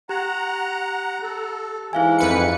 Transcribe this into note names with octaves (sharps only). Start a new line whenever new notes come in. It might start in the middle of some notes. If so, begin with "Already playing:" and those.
G4 F#5 A#5
A4
G#2 E3 E4 F5 G#5
F2 B4 C#7